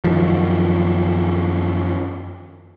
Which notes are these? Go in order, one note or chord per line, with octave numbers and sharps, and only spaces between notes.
F#2 D#3 F3